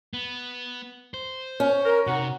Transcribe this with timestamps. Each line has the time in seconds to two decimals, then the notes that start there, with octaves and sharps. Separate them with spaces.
0.13 B3
1.14 C5
1.60 C#4
1.85 A#4
2.07 C3 D#4 F#4 F#5